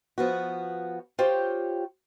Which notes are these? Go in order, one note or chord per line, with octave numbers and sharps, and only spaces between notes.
F3 B3 F#4
F4 G4 C5 C#5 G5